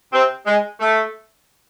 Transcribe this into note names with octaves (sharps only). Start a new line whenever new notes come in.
C3 C4
G#3
A3